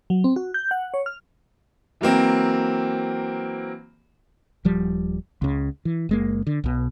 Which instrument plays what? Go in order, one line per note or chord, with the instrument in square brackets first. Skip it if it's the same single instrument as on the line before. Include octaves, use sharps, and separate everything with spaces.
[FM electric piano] F#3
C4
F#4
G6
F#5
C#5
F6
[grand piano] E3 F#3 A#3 C4
[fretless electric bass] D#1 F3 G3
C#2 C#3
E3
F#1 G#3 A#3
D3
B1 B2